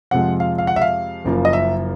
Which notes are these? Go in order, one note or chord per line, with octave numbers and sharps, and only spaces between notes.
F2 C3 F3 G#3 F#5
F5
F5
F#5
E5
F5
F#1 F#2 C#3 F3 A#3
D#5
E5